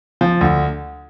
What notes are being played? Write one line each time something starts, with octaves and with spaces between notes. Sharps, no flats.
F3
D2